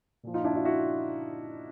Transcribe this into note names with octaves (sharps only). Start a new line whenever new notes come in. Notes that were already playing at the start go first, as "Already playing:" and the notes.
A#2 F3
D#4 F4
D4 E4
E4 F#4
E4 F#4